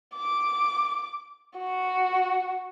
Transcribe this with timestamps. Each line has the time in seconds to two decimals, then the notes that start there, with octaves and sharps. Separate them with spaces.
0.16 D6
1.58 F#4